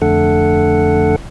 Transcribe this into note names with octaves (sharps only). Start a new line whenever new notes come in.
F2 D3 A3 A4 F#5